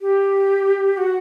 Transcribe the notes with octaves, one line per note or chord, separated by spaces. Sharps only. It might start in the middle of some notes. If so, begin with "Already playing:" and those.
G4
F#4